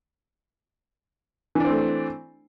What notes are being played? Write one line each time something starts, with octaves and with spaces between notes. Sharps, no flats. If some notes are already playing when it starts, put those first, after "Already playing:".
E3 A3 C4 D4